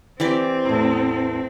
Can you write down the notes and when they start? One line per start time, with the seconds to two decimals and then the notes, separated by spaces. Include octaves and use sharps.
0.20 E3 C4 G4 D5
0.65 E2 A2